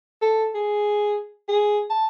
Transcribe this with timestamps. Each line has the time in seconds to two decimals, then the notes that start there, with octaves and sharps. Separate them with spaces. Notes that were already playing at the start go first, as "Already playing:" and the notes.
0.22 A4
0.55 G#4
1.48 G#4
1.90 A5